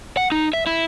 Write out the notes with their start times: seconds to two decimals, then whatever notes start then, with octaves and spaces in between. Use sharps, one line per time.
0.17 F#5
0.32 D#4
0.53 E5
0.67 E4